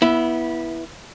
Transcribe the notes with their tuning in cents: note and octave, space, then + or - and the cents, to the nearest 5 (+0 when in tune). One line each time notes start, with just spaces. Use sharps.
B3 -20 E4 +0